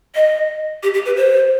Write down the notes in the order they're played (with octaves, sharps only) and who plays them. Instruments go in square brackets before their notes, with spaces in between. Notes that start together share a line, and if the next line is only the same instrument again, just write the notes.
[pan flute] D#5
G4
G4
B4
C5